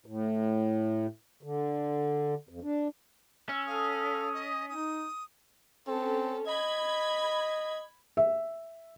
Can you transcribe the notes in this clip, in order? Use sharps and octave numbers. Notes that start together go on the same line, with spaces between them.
A2
D3
F2
D4
C#4 E6
A4 F5 D#6
D#5
D#4 D#6
C4 C#4 A4
D#5 B5 G#6
E5